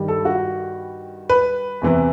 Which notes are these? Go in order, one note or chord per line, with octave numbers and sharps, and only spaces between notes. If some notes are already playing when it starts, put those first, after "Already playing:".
Already playing: G2 D#3 G3
A4
F#4
B4
E2 C3 E3